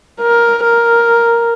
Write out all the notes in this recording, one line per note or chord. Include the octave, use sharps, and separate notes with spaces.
A#4
A#4